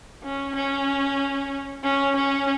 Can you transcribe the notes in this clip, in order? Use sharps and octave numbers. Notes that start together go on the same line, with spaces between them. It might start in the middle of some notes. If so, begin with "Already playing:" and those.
C#4
C#4
C#4
C#4